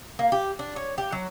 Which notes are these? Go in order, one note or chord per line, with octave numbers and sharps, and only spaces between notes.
A#3
G4
D4
C#5
G4
F#3